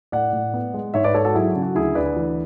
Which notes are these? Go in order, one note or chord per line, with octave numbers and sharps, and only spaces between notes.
A2 D5 F#5
A2
B3
G#3
G#2 C#5 E5
B4 D5
G#2 A4 C#5
F#4 A4
F#3 E4 G#4
F#4
C#3
F#4
D2 E4 G#4
D2 B4 D5
E3